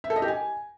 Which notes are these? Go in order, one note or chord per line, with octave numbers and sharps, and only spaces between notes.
E5
A4
D#5
G4
G#5